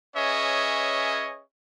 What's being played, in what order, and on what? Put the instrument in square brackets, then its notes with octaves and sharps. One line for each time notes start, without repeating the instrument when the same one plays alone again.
[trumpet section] C#4 G#4 B4 C#5 D#5 E5